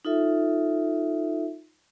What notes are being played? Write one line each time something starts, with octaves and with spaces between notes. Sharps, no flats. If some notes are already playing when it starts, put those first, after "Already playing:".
D#4 F4 A4 E5